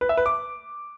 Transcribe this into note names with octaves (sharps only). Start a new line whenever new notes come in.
B4
E5
B4
D6